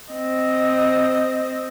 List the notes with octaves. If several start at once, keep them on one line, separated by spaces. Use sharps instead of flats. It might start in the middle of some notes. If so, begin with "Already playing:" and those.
C4 D#5